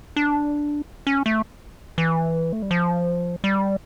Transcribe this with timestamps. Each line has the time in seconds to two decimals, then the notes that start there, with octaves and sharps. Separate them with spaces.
0.16 D4
1.07 C#4
1.26 A3
1.98 E3
2.53 A3
2.62 G3
2.71 F3
3.44 G3